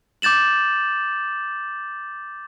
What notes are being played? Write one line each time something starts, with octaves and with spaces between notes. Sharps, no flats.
D6 G6 A6 E7 F#7